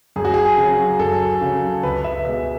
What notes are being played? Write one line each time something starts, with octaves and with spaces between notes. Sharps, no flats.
F#2 G#4
F#4
G#4
C#3 F#3
F#2 A4
C#3 F#3
C#2 B4
E5
B2 G#3 E5